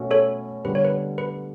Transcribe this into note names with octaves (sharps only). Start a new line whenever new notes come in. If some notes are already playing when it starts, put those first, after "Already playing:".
Already playing: B2 A3 C#4 F#4
A4 C#5
D3 G3 B3 B4
C#5
B4
B4